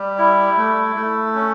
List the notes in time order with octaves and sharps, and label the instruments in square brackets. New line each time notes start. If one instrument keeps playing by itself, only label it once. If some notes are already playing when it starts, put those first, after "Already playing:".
Already playing: [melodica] G3
E4
A3
A3
C#4